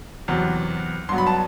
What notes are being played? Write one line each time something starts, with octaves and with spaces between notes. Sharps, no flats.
E2 C3 F#3 B3
G2 F#3 B3 C6
B5
A5